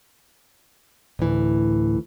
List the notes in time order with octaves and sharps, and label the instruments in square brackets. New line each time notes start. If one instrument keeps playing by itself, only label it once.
[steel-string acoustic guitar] D2 E3 [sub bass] A2